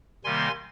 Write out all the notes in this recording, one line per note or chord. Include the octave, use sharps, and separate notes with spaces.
C3 D#3 G3 A#3 G#5 C6